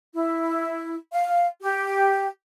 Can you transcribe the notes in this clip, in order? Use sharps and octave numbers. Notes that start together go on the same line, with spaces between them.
E4
F5
G4